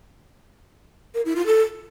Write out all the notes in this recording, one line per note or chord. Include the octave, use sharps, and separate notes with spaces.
A#4
E4
F4
A4